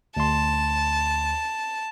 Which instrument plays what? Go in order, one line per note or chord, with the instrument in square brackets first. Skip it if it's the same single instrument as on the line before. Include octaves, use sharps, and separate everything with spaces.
[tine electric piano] D2 C6 [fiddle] A5